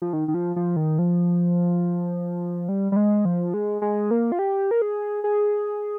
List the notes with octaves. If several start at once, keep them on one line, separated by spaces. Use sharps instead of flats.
F3
D#3
D#3
F3
F3
D#3
F3
G3
G3
G#3
F3
G#3
G#3
A#3
F4
G4
A#4
G#4
G#4